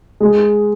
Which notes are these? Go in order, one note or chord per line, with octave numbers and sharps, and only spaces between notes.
G#3